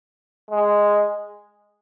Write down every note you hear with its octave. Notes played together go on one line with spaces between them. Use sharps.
G#3